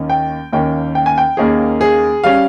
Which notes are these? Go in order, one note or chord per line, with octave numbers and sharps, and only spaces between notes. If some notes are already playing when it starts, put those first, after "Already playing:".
Already playing: D#2 D#3 A#3 C#4
G5
D#2 D#3 A#3 C#4 G5
G5
G#5
G5
D#2 D#3 A#3 C#4 G#4
G#4
G3 C#4 F5